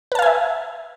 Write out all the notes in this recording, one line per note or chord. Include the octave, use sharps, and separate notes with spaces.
B4 E5 F5 G#5 A5